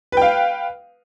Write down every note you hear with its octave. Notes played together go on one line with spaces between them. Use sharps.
B4 F5 G5